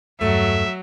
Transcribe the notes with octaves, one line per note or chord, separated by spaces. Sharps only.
E2 G2 F#3 A3 E5